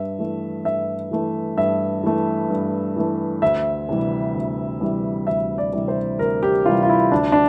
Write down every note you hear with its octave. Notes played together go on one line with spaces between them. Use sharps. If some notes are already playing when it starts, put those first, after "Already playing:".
Already playing: G2 E5
E3 A3
G2 E5
E3 A3
G2 E5
E3 A3
G2
E3 A3
D2 E5
C3 E3 G3
D2
C3 E3 G3
D2 E5
D5
C3 E3 G3
C5
D2 A#4
G4
C3 E3 G3 F4
F4
E4
D2 D4
D4